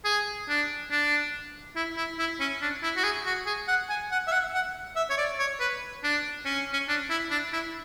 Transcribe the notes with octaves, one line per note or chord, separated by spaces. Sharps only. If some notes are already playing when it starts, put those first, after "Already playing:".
G#4
D4
D4
E4
E4
E4
C#4
D4
E4
F#4
G#4
F#4
G#4
F#5
G#5
F#5
E5
F#5
F#5
E5
C#5
D5
C#5
B4
D4
C#4
C#4
D4
E4
D4
E4